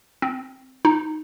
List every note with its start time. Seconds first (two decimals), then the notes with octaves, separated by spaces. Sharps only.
0.22 C4
0.85 D#4